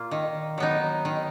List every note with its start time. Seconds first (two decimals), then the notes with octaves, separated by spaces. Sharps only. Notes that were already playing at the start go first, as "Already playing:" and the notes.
Already playing: A#2 A#3 F4
0.11 D#3
0.58 F#3 B3 D#4
1.05 D#3